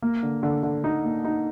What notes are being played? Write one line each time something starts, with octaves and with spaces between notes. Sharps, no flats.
A#3
D3
D3
D3
D#4
A#3
D#4